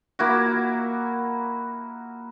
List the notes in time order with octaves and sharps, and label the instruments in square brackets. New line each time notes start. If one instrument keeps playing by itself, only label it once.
[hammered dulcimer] A#3 E4 F#4